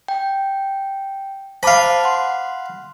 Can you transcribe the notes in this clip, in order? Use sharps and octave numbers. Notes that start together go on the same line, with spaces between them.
G5
C5 F5 A5 B5 D6
F#5 C6